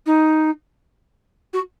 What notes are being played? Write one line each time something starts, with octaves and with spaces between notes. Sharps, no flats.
D#4
F#4